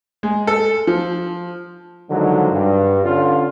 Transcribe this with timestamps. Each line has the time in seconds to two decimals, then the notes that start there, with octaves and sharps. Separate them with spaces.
0.23 G#3
0.47 A4
0.87 F3
2.10 D3 D#3 F3 F#3 G#3
2.51 G2
3.04 D3 C#4 F4